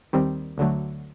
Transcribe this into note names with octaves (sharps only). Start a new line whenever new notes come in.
D#2 D#3 G3 C4
D2 D3 F#3 A3